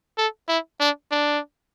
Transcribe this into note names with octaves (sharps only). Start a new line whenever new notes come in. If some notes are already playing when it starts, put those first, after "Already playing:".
A4
E4
D4
D4